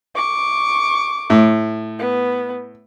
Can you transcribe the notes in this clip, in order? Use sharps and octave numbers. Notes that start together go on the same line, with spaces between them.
C#6 D6
A2
B3